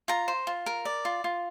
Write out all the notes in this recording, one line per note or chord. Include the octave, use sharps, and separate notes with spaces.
F4 A#5
C5
F4
A#4
D5
F4
F4